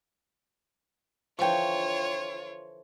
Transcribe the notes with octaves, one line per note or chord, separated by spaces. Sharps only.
D3 E3 F3 F4 C#5 G5 C#6